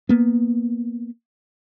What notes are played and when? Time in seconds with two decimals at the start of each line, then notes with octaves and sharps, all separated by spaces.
0.09 A#3 B3